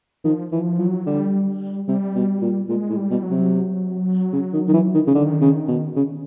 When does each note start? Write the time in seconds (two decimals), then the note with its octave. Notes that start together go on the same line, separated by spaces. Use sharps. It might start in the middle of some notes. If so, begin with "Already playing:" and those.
0.24 D#3 F3
0.52 E3 F3
0.78 F3 F#3
1.06 D3 G3
1.88 C3 G3
2.15 B2
2.42 A#2
2.69 A#2 G#3
2.90 A2
2.97 G3
3.10 B2
3.23 F#3
3.30 C3
4.33 C#3
4.53 D#3
4.68 D#3
4.73 E3
4.94 D#3
5.07 C#3
5.15 D3 D#3
5.41 C#3
5.68 B2
5.96 C#3